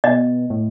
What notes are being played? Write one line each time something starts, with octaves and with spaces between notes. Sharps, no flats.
B2 D#5
A2